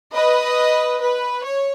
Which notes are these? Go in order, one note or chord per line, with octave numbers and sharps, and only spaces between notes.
B4 D#5
B4
C#5